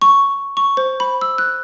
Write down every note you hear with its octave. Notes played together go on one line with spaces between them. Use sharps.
C#6
C#6
C5
B5
E6
F#6